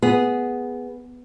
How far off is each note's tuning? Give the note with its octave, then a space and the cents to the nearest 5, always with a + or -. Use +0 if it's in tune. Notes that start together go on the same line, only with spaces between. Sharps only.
B3 +0 G#4 +0